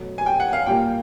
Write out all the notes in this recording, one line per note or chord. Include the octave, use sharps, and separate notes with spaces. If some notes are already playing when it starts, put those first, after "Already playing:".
Already playing: B2 F#3 A3
G#5
G5
F#5
F5
A#2 G3 A#3 G5